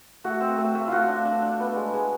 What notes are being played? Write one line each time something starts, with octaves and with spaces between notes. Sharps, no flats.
A3 F#4
C4
A3
A3
A3 F4 F#4
D4
D4
D4
B3
G#3
G#3